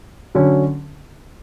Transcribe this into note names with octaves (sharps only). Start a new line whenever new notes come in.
D3 F#3 C#4